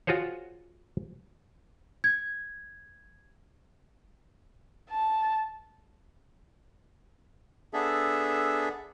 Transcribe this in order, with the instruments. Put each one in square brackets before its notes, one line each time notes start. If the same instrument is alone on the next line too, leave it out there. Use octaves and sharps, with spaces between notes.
[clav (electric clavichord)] F4 F#4 G#4 C5 C#5
[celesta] G#6
[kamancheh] A5
[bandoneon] B3 D4 G#4 A4 E5